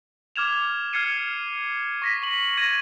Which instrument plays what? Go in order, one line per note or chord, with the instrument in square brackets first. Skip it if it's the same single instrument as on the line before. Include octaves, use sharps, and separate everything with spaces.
[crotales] D6 F6 G#6 E7 F7
F6 G#6 C7 C#7 D#7
C#6 A#6 B6
C#6 F#7
C#6 G#6 A#6 D#7